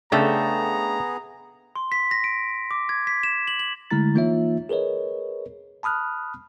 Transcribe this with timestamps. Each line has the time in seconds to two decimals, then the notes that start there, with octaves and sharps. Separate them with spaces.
0.12 C#3 A3 B3 D4 G#4 A4 G5 A#5
1.76 C6
1.92 B6
2.11 A#6
2.24 D7
2.71 D6
2.89 G#6
3.07 B6
3.23 E7
3.48 F#7
3.59 F#7
3.91 D3 G#3 A3 E4 A#5 A6
4.15 E3 A#3 D#4 F4 C#5 E5
4.69 G#4 A#4 B4 C#5 D#5
5.83 A5 B5 D#6 F6 F#6